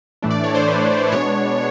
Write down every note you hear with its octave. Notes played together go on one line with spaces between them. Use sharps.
A2 E3 A3 D4
D5
C#5
C5
B4
B2 G#3 B3 D4 C#5